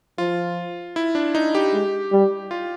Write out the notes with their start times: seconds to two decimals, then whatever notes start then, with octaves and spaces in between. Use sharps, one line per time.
0.18 F3 F4
0.96 E4
1.15 D4
1.35 D#4
1.55 G4
1.73 G#3
2.12 G3
2.51 F4